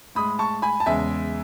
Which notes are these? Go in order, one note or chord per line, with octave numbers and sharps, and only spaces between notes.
A2 G#3 B5 D#6
A5 C#6
G#5 B5
A5
E2 C#3 G#3 E5 G#5